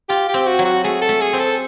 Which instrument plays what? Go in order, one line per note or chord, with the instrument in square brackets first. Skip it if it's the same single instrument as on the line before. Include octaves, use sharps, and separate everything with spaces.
[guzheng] F4 [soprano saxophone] G4
[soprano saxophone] G4
[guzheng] C4
[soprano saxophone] F#4
[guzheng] F#3
[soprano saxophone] F#4
[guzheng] A3 [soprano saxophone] G#4
[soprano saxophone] A4
[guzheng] A3
[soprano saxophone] G#4
[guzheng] C4
[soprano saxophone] A4